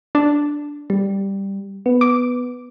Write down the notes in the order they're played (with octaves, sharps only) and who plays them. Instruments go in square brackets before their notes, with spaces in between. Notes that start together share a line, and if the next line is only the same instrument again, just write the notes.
[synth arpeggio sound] D4
[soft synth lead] G3
B3
[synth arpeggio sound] D6